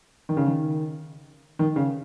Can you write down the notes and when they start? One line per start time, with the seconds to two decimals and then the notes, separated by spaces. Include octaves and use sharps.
0.29 D#3
0.37 C#3
0.46 D#3
1.59 D#3
1.76 C#3